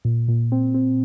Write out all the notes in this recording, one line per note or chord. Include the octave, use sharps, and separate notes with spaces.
A#2
A#2
C4
C4